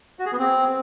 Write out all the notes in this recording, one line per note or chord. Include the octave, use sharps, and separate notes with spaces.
F#4
G#4
B3
C4